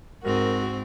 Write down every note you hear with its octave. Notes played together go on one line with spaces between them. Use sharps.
G#2 C4 F#4 A#4